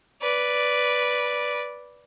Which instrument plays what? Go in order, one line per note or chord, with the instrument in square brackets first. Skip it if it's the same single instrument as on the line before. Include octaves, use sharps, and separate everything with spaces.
[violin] B4 D5